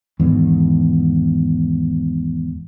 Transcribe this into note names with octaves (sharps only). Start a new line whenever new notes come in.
G#1 E2 G#2